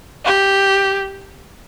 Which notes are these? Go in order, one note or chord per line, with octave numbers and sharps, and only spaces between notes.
G4